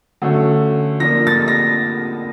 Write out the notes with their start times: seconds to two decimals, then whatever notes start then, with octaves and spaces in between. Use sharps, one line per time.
0.22 D3 F#3 A3 C#4
1.00 F3 A#3 D4 A#6
1.27 A6
1.48 A#6